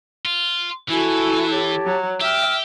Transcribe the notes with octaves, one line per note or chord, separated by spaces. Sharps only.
F4
E3 E4 F#4 A4 G#5
G4 C#5 A5
F#3
G4 E5 G5 F6